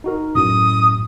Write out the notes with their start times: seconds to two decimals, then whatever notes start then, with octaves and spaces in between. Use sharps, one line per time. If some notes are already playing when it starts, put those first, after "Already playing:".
0.04 D#4 F#4 A#4
0.35 F#2 A2 D#6